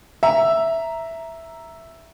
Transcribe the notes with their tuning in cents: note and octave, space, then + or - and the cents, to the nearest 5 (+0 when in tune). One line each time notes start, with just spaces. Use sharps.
E5 +0 A#5 +0